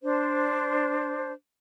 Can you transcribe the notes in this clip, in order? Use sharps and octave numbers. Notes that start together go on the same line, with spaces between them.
D4 C5